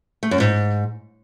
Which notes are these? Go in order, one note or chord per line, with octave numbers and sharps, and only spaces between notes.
A3
F#2
G#2